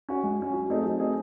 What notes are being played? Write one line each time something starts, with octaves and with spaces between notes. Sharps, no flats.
C#4 F#4
G#3
C#4 F#4
F#3
A3 C4 D#4 G#4
F#3
A3 C4 D#4 G#4